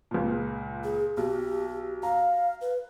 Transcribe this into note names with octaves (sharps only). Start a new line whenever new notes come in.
C#2 A#2
G#4
B1 G4
F5 A#5
B4